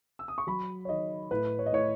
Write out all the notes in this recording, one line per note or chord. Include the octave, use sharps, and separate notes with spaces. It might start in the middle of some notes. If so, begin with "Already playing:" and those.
E6
D#6
C#6
F#3 B5
C#5
D#3 D#5
A2 B4
C#5
D#5
A2 C#5